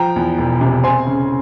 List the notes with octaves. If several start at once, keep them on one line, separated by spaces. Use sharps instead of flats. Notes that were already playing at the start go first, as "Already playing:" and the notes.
Already playing: F3 G5 A#5
E2
E1
C3
C4 G#5 C6
C#3